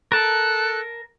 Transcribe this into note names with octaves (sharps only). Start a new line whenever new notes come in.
A4 A#4 A5 F#6